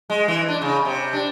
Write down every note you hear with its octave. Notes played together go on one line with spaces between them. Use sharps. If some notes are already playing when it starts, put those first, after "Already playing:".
G#3
E3
D4
C#3
C3
D4